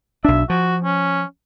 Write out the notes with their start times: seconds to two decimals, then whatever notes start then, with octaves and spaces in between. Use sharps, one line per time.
0.25 B1 D4 E5
0.50 F3 F#4
0.85 C#4